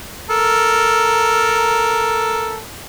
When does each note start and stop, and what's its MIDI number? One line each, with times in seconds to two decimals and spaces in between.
0.30 2.59 69
0.30 2.59 70